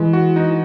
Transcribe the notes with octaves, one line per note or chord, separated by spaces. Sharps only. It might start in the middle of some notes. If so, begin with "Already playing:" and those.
Already playing: E3 G#3
F#4
D#4